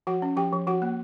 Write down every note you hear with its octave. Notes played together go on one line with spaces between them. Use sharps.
F3 F#4 F#5
C#4
F3 G4 G5
F3
F3 F#4 F#5
A#3